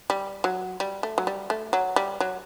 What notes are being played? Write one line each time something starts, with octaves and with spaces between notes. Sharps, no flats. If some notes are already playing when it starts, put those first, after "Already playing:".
G3
F#3
G3
A3
F#3
G3
A3
F#3
G3
F#3